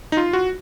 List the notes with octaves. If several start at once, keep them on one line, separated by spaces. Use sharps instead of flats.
D#4
F4
F#4